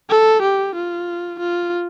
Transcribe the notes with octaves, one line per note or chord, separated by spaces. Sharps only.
A4
G4
F4
F4